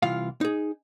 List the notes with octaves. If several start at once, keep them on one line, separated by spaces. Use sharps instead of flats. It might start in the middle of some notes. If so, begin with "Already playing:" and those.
C2 E3 F4 F5
D#4 G#4